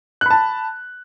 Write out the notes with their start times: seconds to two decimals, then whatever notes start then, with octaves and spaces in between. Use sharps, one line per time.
0.21 F#6
0.26 B5
0.30 A5